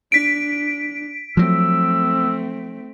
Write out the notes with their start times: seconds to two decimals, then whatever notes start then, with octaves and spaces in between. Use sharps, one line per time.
0.12 D4 B6 D7
1.37 F3 F#3 A3 C4 E6